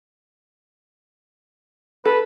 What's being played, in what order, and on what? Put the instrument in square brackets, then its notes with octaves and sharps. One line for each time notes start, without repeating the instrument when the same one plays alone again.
[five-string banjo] A4 [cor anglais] B4